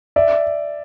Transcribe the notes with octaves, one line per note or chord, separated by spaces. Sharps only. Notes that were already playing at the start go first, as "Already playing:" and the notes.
D5 E5